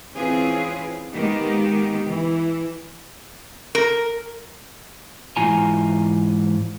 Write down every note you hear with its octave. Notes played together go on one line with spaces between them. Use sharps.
E3 C4 C#4 F4 G#4 B4
D#3 G#3 A#3 B3 D#4 G4
E3
A#4
G#2 E3 F4 G#5 A#5